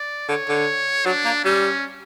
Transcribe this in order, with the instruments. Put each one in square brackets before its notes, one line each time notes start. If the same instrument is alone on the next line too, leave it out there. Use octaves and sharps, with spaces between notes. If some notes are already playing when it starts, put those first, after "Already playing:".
Already playing: [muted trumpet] D5
[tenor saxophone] D3 [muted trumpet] C#5
[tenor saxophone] D3
[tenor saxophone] F#3 [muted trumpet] D4
[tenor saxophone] A#3
[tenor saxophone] G3 [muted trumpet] C#4